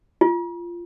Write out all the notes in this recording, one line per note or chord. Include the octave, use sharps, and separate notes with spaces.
F4